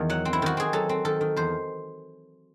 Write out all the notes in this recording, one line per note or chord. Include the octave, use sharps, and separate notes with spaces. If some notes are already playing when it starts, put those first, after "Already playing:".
Already playing: E2 D#3
F#3 F#5
C4
E4
D#3 F#4
C4 G#4
F#3 A4
C4
D#3 A4
D#3
E2 C5